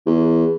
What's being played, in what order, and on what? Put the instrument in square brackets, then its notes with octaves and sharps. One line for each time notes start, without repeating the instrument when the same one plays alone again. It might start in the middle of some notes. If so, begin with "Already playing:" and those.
[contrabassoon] E2